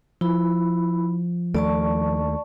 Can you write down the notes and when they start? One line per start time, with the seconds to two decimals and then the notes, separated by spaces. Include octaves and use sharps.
0.21 F3 E4 B5
1.55 D#2 A3 D5 A5 C#6